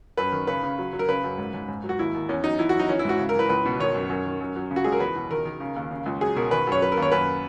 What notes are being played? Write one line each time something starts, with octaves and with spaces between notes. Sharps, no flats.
F#2 B4
D#3
C#3 B4
C#3
F#3
F#3
A#4
C#3 B4
F#2
G#2
G#2
G#2
F#3
F#4
D#2 E4
D#2
E2 C#4
F#3 D#4
E2 E4
F#4
F#3 D#4
E3 C#4
E4
G#2 F#4
C#3
A#4
E3 B4
C#2 B4
B2
D#3 C#5
F#2
F#2
D#3
F#2
F#3
C#3
F#4
C#2 G#4
A#4
E2 B4
B2
D#3 A#4
D#3
C#3
D#2
C#3
C#2
F#3 G#4
B2 A#4
D#3 B4
F#2 C#5
F#3 B4
A#4
D#2
C#5
F#2 B4